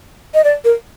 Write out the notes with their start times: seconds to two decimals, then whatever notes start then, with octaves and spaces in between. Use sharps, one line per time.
0.34 D#5
0.44 D5
0.65 A#4